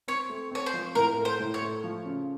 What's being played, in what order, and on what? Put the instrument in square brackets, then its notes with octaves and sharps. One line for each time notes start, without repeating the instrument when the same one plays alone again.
[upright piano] C4 [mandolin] C#5
[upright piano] A3
[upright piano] C4 [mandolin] C#5
[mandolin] C5
[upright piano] F3
[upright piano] A2 [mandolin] A#4
[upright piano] A3
[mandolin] C5
[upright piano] A2
[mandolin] C#5
[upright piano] A3
F3
C#3